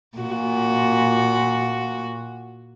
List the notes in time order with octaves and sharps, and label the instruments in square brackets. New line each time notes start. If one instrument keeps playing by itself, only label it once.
[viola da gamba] A#2 F#4